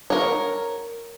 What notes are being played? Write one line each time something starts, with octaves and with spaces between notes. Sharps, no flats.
A#4 C#5